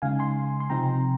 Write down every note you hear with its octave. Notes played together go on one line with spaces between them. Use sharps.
C#3 G#3 D#4 F5 G#5
G#5 C6
C6
C3 F3 C4 D#4 G5 A#5